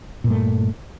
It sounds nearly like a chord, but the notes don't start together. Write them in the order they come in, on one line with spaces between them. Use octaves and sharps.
A#2 G2 A3